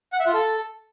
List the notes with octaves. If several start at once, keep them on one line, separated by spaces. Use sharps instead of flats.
F#5
E5
F4
A4